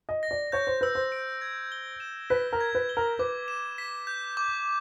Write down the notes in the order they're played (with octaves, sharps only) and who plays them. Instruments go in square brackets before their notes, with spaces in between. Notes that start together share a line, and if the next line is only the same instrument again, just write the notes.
[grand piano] D#5
[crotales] A#6
[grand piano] D5
[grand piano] C#5 [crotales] G6
[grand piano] C5
[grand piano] B4 [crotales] E6
[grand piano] C5
[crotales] D7
G#6
G7
E7
[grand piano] B4 [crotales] B6
[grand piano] A#4
[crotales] G#6
[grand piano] B4
[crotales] G7
[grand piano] A#4
[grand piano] B4 [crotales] D6
[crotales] E7
B6
G6
D6